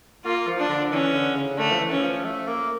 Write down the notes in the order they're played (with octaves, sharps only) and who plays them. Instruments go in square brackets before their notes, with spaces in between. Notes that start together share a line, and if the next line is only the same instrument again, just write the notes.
[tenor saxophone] A#3 [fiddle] F4
[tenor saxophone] F3
[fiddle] D4
[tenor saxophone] D3
[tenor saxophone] E3 [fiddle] C#4
[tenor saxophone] D3
C#3
[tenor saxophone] D3 [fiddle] A3
[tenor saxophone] F3
E3
[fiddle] C#4
[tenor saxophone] E3
F3
A3
A#3